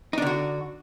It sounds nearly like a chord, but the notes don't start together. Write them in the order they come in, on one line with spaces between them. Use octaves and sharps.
D#4 D4 D3 F#4